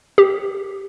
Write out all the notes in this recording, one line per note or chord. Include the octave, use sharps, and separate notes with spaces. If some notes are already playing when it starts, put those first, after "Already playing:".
G4